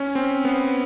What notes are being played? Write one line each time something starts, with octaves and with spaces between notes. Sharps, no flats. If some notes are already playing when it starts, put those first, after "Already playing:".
Already playing: C#4
C4
B3